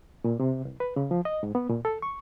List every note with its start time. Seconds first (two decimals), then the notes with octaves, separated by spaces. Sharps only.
0.24 A#2
0.40 C3
0.65 C2
0.80 B4
0.96 C#3
1.11 F3
1.25 D#5
1.43 G#2
1.55 B3
1.69 A#2
1.85 A4
2.02 C#6